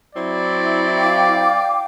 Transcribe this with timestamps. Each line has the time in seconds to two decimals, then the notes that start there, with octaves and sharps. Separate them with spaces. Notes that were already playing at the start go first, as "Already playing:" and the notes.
0.15 F#3 C4 E4 D5
0.97 F5 G5 D6